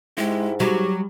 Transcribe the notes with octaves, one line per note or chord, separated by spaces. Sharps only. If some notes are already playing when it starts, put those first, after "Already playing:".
G#2 G#3 E4 G4
F#3 G3 G4